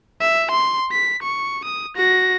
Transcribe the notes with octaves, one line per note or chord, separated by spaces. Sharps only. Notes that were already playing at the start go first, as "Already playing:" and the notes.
E5
C6
B6
C#6
D#6
F#4 A#6